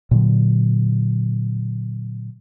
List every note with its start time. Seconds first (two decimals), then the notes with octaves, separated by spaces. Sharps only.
0.11 A#2 D3 F#3